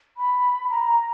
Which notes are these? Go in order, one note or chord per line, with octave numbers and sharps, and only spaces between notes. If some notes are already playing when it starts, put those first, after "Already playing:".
B5
A#5